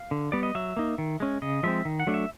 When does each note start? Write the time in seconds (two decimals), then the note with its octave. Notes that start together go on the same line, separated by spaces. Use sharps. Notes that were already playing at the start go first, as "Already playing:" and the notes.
Already playing: F5
0.11 D3
0.32 G3 B3 D5
0.43 D#5
0.55 F#3 E5
0.77 A#3 D#4
0.98 D#3
1.20 G#3 C#4
1.42 C#3 D#5
1.63 F3 G#3 C4 E5
1.85 D#3
2.00 F#5
2.07 F#3 A3 D4
2.14 E5